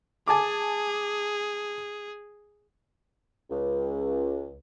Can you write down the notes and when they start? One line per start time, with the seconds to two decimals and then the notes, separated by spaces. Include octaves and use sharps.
0.28 G#4 G#5 A5 D6
3.50 C#2